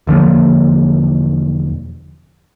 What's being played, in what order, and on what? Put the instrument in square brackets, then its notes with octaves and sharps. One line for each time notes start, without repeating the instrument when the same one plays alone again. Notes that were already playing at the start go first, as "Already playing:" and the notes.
[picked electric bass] E1 D3 F3 A#3